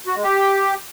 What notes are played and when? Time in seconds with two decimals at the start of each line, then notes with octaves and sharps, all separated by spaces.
0.07 F#4
0.15 G#3
0.24 G4